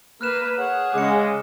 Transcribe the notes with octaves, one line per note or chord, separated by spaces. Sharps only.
A#3 B4 F6 F#6 E7
G#4 C#5 F#5
C#3 G#3 D6 C#7